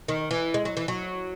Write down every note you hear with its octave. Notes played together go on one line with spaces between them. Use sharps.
D#3
E3
G#3
F#3
E3
F#3